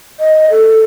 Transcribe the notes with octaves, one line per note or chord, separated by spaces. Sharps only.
D#5
A4